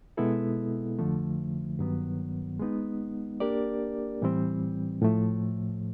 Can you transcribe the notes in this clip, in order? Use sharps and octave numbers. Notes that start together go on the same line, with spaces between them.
B2 G#3 B3 E4 A4
F2 D3 F3 A3
G2 D#3 F#3 B3
G#3 B3 D#4
A#3 D4 G4 A#4 D5
A2 E3 G3 C4
A2 F3 A3